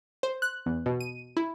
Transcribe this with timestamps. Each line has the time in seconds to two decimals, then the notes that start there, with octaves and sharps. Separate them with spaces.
0.23 C5
0.42 F#6
0.66 E2
0.86 B2
1.00 D#7
1.37 E4